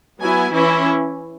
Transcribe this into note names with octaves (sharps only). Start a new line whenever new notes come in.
F#3 B3 E4 G#5
E3 C#4 E4